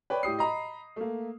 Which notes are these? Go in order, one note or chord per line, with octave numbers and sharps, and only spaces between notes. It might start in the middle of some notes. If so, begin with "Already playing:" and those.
B4 C#5 D5 G5
A2 G4 D#6 C7
D#5 A#5 B5
A3 A#3